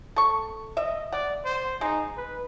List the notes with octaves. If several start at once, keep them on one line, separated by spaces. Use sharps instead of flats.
A4 C#6
D#5 E5
D5 F#5
C5
G#3 D#4
B4